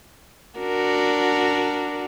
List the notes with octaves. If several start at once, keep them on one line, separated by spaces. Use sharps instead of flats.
D4 F#4 A#4